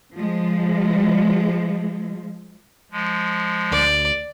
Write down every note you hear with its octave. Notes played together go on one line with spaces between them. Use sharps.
F3 G#3
F3 G#3
D2 D5